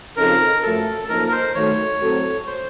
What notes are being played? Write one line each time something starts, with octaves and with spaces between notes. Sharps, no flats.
C#3 F3 C4 D#4 A4 A#4
F#2 F3 A3 A4
F#2 F3 A#3 D#4 A4 A#4
A#4
C5
D#3 F#3 A3 C#5
A2 F#3 C4 F#4 A4
C5